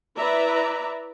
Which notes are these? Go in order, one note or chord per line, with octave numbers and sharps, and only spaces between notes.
E4 B4 D5 E5 A#5